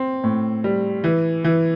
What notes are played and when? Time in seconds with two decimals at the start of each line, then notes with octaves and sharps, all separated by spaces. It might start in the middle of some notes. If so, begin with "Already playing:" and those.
Already playing: C4
0.24 A2
0.64 G3
1.04 E3
1.44 E3